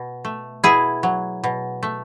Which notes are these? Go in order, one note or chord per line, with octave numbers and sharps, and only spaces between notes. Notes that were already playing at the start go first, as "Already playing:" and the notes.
Already playing: B2
A3
B2 E4 G#4
F#3
B2
A3